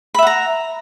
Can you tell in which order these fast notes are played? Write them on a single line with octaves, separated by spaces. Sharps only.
B5 E5 F#5 A#5